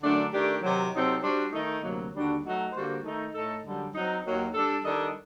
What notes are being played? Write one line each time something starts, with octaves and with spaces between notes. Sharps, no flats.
F#2 D3 A3 D4
D#3 A3 D4 G4
C3 D#3 F#3
C3 F#3 C4 D#4 A4
G3 D4 F#4 C5
D#3 A3 D#4
D2 C3 F#3 A#3
D#2 D3 G3 D4 F#4
F#3 A3 D#4 F#4
D3 G3 A#3 F#4 C5
D#3 A3 D#4
A2 A3 D#4 A4
F#2 D3 G3
F#3 C4 D#4
D#2 D#3 F#3 A#3
G3 D4 A4
D#3 G3 D4 A4 D#5